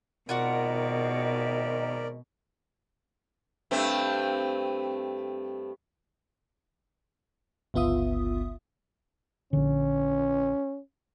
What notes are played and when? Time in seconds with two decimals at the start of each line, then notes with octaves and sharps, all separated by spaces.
0.29 G#1 B2 D#3 F4 F#4 A#4 D5 F#5
3.71 G2 A3 C4
7.74 G1 C#2 B3 F4 E5 D#6
9.53 A#1 D3 C#4